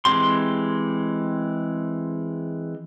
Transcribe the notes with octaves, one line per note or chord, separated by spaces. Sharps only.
E3 G#3 C4 G4 C6